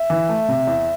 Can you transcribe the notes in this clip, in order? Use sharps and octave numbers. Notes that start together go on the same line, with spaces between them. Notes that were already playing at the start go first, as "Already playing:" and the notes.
Already playing: E5
E3
A3
C3
E2